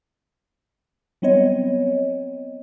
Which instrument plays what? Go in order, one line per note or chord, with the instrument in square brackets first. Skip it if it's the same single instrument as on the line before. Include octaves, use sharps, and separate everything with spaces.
[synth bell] F#3 G3 B3 C4 C#5 D#5